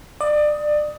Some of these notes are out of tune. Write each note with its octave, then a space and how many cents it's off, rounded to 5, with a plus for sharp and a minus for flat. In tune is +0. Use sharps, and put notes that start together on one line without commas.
D5 +25 D#6 +15